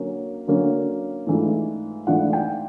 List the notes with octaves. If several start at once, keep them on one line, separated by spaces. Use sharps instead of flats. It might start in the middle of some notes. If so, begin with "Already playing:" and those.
Already playing: D3 F#3 A#3 C#4
D3 F#3 A#3 C#4
G#2 E3 A3 D4 F4
G#2 E3 A3 D4 F4 F#5
G5